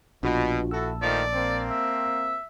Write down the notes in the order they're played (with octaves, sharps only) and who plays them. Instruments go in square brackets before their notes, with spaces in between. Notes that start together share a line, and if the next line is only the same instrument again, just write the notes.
[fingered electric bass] A#1 [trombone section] B2 [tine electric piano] D4 F4 F#4
[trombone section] E4 F#4 A4 [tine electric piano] A5 E6
[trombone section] D#3 F3 A3 [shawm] D5
[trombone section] A#3 C4
[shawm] E5